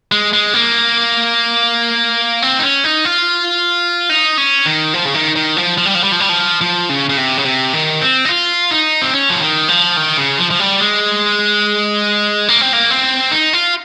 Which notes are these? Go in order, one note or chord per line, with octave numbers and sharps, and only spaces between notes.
G#3
G#3
A#3
C4
D#4
C#4
D#4
F4
D#4
C#4
D#3
F3
C#3
D#3
D#3
F3
F3
G3
F3
G3
F3
G3
F3
F3
C#3
C#3
C3
C#3
C3
D#3
C4
D#4
F4
D#4
C4
C#4
F3
D#3
F3
D#3
C#3
F3
F3
G3
G#3
A#3
C4
A#3
C4
D#4
F4